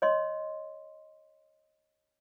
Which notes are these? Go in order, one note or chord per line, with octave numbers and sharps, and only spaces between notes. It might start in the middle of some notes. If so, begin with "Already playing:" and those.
C#5 D#5 C6